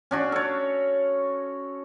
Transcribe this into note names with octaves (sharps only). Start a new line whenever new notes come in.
C#4 D4 F#4
A4 C#5